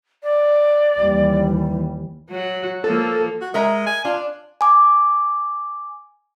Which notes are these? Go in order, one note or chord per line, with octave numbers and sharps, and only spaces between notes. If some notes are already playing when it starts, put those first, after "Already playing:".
D5
D#2 E3 G3
F#3 F#4
F3 A#3 A4
F#4
G#3 A#4 E5 A#5
G#5
D4 F4
G#5 D6